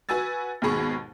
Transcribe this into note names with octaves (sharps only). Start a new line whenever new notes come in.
F#4 B4 G#5 E6 A6
D#2 G#2 B2 G#4 B5 C#6